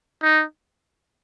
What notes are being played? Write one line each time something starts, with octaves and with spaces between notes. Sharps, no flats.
D#4